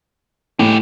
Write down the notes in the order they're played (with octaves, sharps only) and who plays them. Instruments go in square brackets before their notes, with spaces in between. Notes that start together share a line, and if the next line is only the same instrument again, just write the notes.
[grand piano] A2 [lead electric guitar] G#3 G4